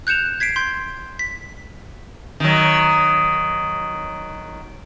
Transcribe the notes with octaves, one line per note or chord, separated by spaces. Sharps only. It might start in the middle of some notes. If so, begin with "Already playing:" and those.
F#6 G6 C#7 E7 F7
G#6 B6 C7 D7
C6 G6
B6
D#3 F#3